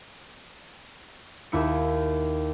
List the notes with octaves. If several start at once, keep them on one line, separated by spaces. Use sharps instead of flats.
D#2 E4 E6 C#7